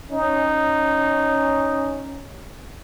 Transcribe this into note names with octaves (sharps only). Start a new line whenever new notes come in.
C#4 D#4